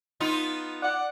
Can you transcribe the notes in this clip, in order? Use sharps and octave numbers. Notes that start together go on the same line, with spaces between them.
B3 D#4 F4
D5 F#5